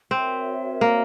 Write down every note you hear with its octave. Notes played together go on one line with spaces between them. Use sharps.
C4 F#4 A#4 C#5 E5
A#3